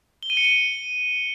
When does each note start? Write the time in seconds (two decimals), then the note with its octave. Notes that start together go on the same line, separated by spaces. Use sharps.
0.23 G7
0.30 D#7
0.37 C#7
0.44 D#7